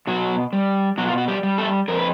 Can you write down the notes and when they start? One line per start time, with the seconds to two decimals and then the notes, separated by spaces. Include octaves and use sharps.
0.07 B2 F#3 F#4
0.53 G3
0.98 B2 F#3 F#4
1.08 F4
1.18 F#4
1.28 G3 G4
1.43 G3
1.58 A3 A4
1.88 F2 A#4
1.97 B4